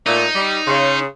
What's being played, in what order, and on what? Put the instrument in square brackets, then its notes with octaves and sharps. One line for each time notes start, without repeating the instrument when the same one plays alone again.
[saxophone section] A#2 A3 [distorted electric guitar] D#4
[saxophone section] G3
[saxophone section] C#3 [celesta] C#5 C6